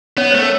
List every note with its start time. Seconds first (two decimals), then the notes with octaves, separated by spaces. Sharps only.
0.17 B3 C#4 C#5
0.31 A3 C5
0.42 A#4